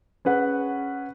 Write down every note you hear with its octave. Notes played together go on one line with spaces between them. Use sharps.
C#4 G#4 B4 F#5